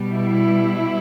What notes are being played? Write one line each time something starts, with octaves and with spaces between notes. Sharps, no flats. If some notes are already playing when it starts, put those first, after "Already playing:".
Already playing: B2 G3
E4